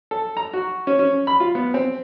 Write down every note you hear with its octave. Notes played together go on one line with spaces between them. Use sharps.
A4
A#5
F#4
C#4
C#4
B5
F4
B3
C4